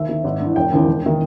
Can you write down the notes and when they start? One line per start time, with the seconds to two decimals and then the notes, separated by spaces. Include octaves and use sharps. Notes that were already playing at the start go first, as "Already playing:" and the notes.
Already playing: D#2 E5
0.09 D#3
0.24 G#1
0.40 G2 E3
0.56 E1 G5
0.72 D#2 C#3 E3
0.87 E1
1.06 D#3